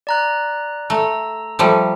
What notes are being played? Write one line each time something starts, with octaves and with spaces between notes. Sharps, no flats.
D5 A#5 F#6
A3 A#5 E6
F3 G3 A3